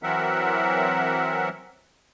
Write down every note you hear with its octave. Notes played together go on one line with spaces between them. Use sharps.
E3 F#3 C4 A#4 E5 F#5